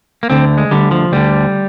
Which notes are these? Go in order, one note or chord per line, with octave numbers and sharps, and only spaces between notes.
A#3
D2 D3 C4
G#3
D2 D3 G3
F3
D2 D3 G3